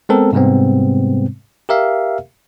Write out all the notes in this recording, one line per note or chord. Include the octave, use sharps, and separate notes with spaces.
G#3 B3 C4 A4 A#4
G#2 C3 G3 G#3 B3 C4
G4 A#4 E5 F5